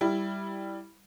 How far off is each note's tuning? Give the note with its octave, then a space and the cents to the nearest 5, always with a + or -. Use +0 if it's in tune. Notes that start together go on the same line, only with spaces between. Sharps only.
G3 +0 E4 +0